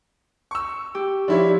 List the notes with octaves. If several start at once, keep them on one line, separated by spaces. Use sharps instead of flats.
C#6 E6
G4
F3 D4 E4 C#5